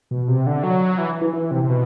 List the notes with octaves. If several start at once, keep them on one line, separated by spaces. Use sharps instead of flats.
B2
C3
D3
F#3
E3
E3
E3
C3
C3
B2